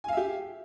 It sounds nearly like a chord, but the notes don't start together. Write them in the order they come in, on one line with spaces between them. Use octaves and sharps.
G#5 F5 E5 G4